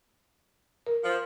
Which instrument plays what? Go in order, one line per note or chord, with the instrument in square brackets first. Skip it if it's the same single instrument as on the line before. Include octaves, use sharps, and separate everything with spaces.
[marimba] A#4
[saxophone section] F3